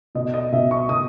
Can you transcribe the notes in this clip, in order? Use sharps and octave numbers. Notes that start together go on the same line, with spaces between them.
B2 D#5
D#5
B2 E5
C#6
B2 D#6